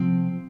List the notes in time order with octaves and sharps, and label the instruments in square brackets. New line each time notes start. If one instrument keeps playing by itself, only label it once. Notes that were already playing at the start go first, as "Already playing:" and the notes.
Already playing: [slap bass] C3 F3 C4